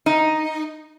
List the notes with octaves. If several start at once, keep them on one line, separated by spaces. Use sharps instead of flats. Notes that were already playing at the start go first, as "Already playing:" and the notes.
D#4